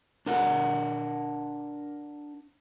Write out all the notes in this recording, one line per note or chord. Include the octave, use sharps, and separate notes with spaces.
D4 A#4 F#5